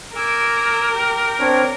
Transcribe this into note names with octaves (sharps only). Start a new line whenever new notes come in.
A#4 G#5 D6 E6
G4
C4 D4 C#5